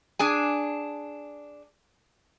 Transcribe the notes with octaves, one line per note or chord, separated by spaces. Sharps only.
D4 G#4 G#5